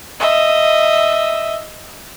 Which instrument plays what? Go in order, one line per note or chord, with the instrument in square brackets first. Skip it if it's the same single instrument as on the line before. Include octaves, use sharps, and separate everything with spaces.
[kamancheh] D#5 E5